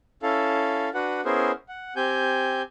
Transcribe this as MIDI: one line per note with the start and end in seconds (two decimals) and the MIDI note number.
0.23 0.89 61
0.23 0.89 64
0.23 0.89 69
0.23 0.89 77
0.94 1.21 62
0.94 1.21 66
0.94 1.21 71
0.94 1.21 78
1.25 1.52 59
1.25 1.52 61
1.25 1.52 64
1.25 1.52 68
1.25 1.52 70
1.25 1.52 72
1.69 1.94 78
1.96 2.62 60
1.96 2.62 67
1.96 2.62 80
1.96 2.62 91